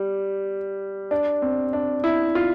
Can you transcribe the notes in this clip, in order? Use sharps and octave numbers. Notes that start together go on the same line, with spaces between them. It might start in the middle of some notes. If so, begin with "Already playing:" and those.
Already playing: G3
D4
C4
D4
E4
F4